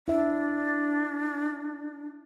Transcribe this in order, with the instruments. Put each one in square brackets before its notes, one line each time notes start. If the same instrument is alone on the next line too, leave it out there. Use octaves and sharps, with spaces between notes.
[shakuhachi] D4 [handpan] E4 E5